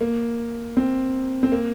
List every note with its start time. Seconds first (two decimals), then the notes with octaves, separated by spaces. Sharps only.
0.01 A#3
0.77 C4
1.43 C4
1.52 A#3